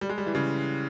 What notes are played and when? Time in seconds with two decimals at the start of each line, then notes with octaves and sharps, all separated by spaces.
0.01 G3
0.09 G#3
0.18 G3
0.26 E3
0.35 C#3